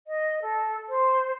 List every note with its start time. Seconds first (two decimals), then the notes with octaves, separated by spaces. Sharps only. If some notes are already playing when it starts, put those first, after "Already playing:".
0.07 D#5
0.41 A4
0.88 C5